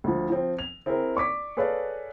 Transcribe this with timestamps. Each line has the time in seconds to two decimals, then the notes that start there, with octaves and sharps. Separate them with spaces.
0.04 D2 F3
0.30 F3 C4
0.59 F7
0.86 C4 E4 G#4 A#4
1.15 D5 C#6 D6 B6
1.57 G#4 A4 B4 C#5 D5 F5